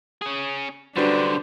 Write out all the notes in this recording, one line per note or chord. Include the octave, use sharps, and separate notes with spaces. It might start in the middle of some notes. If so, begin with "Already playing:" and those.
C#4 G#4
F#2 D3 G3 D4 F#4 B4 C5 C6